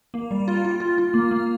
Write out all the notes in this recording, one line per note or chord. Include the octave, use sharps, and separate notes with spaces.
A#3
G3
F4
F4
F4
F4
A#3
A#3